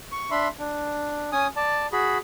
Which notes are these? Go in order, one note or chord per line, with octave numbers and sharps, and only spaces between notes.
C#6
D4 E5 B5 C6
D4
C#4 G#5 D#6
D5 A5
F#4 G#4 B5